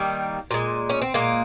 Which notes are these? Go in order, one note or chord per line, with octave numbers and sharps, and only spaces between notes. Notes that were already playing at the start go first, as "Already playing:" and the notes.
Already playing: D#3 G3 A#3
A#2 G#3
C#4
C4
A#2 G#3 A#3